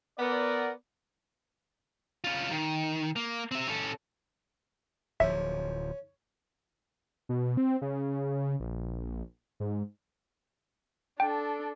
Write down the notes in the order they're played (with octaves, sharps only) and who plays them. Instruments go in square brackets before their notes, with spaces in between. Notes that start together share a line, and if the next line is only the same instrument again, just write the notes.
[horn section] B3 [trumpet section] A#4 D5
[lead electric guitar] C#4 F4
D#3
A#3
C4 E5
C#4 A4
[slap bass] D1 F3 [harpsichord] C#4 [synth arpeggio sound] E5
[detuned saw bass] B2
C4
C#3
A#1
G#2
[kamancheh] D4 A4 [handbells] G5